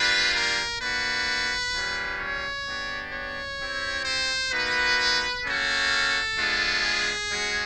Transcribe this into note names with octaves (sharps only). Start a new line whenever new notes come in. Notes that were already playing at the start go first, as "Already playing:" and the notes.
Already playing: G3 A#3 D4 F4 B4
A#4
A#3 D4 F#4 B4
G3 A#3 C#4 F4
C#5
B3 D4 G4
C#5
C4 E4 G4
C5
A#3 D#4 F#4 B4
A#3 C#4 F#4 A4
G#3 B3 D4 F4
G#4
G#3 C#4 F#4